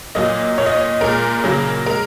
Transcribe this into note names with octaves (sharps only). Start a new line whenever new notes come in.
A#2 F#3 A#3 D#5
A#2 A#3 C#5
D#5
C#5
A#2 G#3 A#4
C#3 F#3 A#3
G#3 A#4